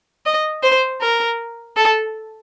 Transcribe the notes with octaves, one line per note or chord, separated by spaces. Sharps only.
D#5
C5
A#4
A4